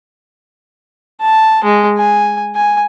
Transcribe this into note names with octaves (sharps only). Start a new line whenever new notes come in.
A5
G#3
G#5
G#5